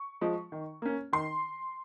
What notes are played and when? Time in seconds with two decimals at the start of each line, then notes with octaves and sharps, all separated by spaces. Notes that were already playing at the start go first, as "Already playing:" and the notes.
Already playing: C#6
0.21 F3 G#3
0.52 D#3
0.82 A#3 C#4
1.13 D#3 C6